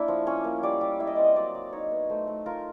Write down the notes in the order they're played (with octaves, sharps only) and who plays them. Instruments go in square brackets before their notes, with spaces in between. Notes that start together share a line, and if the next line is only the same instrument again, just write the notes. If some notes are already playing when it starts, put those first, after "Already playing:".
Already playing: [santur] A#3 D4 E4
F3
C#4 C#5
A#3
G3 D5
G3
E4 E5
D#5
C4 D5
D#5
F#3 D5
F#3
D#4 C#5
B3
A3 C5
A3
F4 A#4